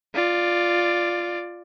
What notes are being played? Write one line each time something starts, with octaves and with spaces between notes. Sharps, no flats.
F4 D5